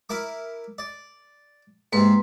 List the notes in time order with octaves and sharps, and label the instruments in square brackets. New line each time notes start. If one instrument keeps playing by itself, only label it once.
[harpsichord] E4 A#4 D6
D5
[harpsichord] G#2 C3 [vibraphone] A#3 B4 C6